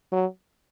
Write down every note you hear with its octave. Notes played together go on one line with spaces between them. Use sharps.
F#3